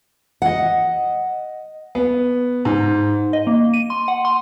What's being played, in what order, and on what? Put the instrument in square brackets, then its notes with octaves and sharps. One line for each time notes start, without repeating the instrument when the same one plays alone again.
[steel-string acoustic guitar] D#5 F#5
[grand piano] B3
G#2
[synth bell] D#5
A#3
D#7
C6
F#5
C6